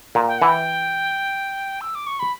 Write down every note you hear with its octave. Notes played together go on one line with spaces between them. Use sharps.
A#2
G5
E3 F#5
G5
E6
D6
C#6
B5